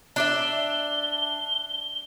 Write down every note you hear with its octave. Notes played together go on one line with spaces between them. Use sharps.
D4 D5 E5 G7